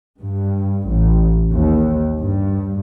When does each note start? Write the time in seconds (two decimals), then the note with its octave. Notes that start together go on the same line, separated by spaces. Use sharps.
0.20 G2
0.88 A1
1.51 D#2
2.18 G2